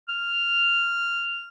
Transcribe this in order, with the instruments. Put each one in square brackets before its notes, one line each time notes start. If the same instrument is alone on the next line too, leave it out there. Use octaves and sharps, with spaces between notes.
[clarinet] F6